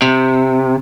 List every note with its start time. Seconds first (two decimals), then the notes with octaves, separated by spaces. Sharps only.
0.02 C3